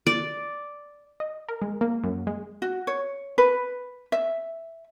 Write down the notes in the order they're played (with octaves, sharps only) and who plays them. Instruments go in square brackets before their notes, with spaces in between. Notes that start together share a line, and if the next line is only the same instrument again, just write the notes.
[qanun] D5
[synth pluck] D#5
A#4
G#3
A#3
F#2
G#3
[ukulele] F#4
C#5
B4
E5